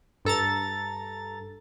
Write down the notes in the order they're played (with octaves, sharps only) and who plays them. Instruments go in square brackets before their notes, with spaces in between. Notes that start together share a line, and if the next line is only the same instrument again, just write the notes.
[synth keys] G2 A4 A#5 A6